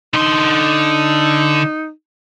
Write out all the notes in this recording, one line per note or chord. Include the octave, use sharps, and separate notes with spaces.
D3 D#4 C6